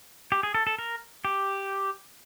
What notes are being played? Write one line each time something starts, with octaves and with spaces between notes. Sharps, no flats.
G4
G#4
A4
A4
A#4
G4